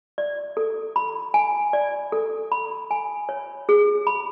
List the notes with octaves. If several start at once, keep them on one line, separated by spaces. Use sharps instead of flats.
D5
A4
B5
G#5
D5
A4
B5
G#5
C#5
G#4
B5